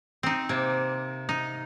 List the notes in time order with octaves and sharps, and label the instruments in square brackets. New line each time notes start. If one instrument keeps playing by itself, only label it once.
[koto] C4 D#4
[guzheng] C3 [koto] A#3
[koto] D#4